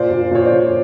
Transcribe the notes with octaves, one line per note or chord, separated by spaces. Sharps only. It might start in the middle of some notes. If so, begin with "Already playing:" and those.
Already playing: A#2 C5 D5
A#2
A#2 C#5
C5 D5
A#2